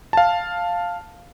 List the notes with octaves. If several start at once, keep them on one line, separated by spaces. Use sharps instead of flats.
F5 A5